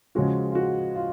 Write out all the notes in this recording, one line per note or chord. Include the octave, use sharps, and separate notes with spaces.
C#3 F3 G#3 C#4 F#4
F4
F#4
F4